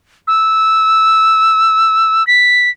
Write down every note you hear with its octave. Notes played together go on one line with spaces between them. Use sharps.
E6
B6